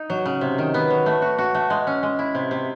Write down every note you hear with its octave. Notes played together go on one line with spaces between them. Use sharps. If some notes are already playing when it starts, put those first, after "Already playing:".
Already playing: D#4
F#3
C#3
C3
D#3
B3
F#3
A3
F#4
F#4
A3
G#3
C#4
G#3
E4
C3
C3